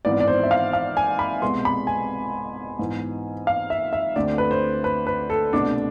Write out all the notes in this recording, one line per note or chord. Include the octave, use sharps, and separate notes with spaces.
G#1 G#2 E3 B3 D5
D5
C5
E5
F5
F5
G#5
B5
C2 B2 G#3 B3 C6
B5
G#5
G#2 E3 B3
F5
E5
E5
D2 D3 A3 C4 D5
B4
C5
B4
B4
A4
C2 B2 A3 D4